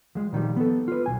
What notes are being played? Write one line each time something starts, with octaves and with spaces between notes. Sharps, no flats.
F3 G#3
A#2 D#3 F3 G3
B3 A4
F4 B4
B1 C#3 G#5